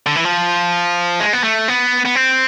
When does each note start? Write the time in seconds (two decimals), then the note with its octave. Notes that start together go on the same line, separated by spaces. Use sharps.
0.06 D3
0.16 E3
0.24 F3
1.20 G#3
1.33 B3
1.44 A3
1.68 B3
2.05 B3
2.15 C4